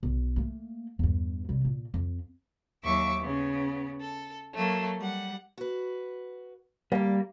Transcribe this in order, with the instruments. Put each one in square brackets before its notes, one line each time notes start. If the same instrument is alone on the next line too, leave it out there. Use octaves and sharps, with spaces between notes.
[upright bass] B1
A3 A#3
E2 G2
C3 G3
A#2
F2
[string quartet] D#2 F#3 E5 C#6 D6 E6
C#3 B3
A4
F#3 A3 A#3
G3 F#5
[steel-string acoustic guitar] F#4 B4
[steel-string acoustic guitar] D2 G4 [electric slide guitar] G3 [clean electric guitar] A#3